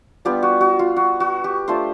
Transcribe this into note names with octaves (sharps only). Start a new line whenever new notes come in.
G3 B3 D4 F4 G4
F#4
F#4
F4
F#4
F#4
G4
A3 D4 F4 C5